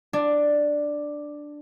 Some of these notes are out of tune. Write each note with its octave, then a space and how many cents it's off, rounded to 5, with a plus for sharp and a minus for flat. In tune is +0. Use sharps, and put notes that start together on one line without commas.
D4 +5